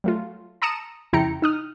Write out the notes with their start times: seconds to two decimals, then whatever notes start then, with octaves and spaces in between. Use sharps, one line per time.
0.04 F#3 A3 F4
0.62 A5 A#5 D#6 C#7 D#7 E7
1.13 F2 C#3 E4 G5 A#5 C#7
1.42 D#4 D#6 F6